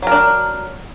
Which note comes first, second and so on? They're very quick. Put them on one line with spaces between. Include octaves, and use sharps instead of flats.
F#3 A#4 D4